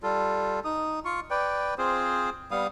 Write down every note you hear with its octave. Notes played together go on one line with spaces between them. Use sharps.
G3 F4 A4
D#4 D#6
F4 C#6
B4 D5 G5
C4 F4 G#4 C5
G3 B3 F5 D#6